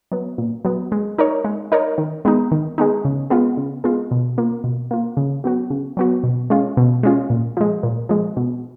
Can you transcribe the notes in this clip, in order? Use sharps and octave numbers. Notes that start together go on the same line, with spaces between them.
F#3 B3
A#2
F#3 B3
G#3
D#4 A#4 C#5
G#3
D#4 A#4 C#5
D#3
G#3 B3 D#4
D#3
G#3 B3 D#4
C#3
G#3 B3 F4
C#3
G#3 B3 F4
B2
A#3 F4
B2
A#3 F4
C#3
F#3 B3 F#4
C#3
F#3 B3 F#4
B2
G#3 C#4 F4
B2
G#3 C#4 F4
A#2
F3 G#3
A#2
F3 G#3
B2